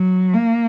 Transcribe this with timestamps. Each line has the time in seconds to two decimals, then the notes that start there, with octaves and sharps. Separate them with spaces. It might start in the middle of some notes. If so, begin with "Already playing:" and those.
Already playing: F#3
0.34 A#3